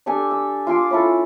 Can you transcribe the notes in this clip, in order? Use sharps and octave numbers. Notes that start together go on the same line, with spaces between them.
D4 G4 A4 G#5
E6
F4 G#5 C6 D6
C#4 E4 A4